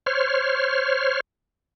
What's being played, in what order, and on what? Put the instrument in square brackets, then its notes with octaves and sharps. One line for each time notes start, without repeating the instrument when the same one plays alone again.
[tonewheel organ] C5 C#5 F6